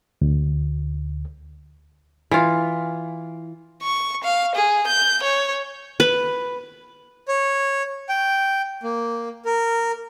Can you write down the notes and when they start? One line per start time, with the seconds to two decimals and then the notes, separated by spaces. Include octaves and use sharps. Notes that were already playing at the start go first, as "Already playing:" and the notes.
0.22 D2
2.31 E3 F4
3.83 C#6
4.24 F5
4.55 G#4
4.87 G6
5.23 C#5
6.00 B4
7.28 C#5
8.09 G5
8.83 A#3
9.45 A#4